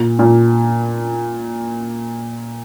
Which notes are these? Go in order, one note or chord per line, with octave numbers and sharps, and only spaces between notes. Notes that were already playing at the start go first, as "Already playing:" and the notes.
Already playing: A#2
A#2